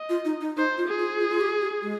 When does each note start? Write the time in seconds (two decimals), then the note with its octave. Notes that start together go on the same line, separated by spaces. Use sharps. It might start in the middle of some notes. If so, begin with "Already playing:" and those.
Already playing: D#5
0.09 F4
0.25 D#4
0.41 D#4
0.57 D#4 C5
0.78 F4
0.88 G#4
0.99 F4
1.19 F4
1.30 F4
1.41 G4
1.61 G4
1.82 G#3